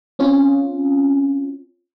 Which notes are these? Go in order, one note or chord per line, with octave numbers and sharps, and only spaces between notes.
C4 C#4 F4